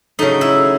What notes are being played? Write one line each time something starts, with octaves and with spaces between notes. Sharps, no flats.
C#3 F#3 A3 D#4
E4